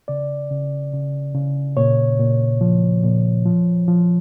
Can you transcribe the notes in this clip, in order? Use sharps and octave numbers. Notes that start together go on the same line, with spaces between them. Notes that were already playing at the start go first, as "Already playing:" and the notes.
C#3 D5
C#3
C#3
C#3
A#2 C#5
A#2
F3
A#2
F3
F3